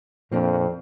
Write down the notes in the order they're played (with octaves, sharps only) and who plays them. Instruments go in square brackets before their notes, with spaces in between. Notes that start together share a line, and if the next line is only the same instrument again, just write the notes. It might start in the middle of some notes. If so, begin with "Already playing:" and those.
[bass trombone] F2 [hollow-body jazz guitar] A#2 F3 A#3 D4